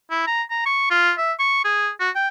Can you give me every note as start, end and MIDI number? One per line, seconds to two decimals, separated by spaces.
0.10 0.26 64
0.27 0.42 82
0.50 0.62 82
0.66 0.89 85
0.90 1.12 65
1.18 1.33 76
1.39 1.61 85
1.64 1.89 68
2.00 2.10 66
2.15 2.28 79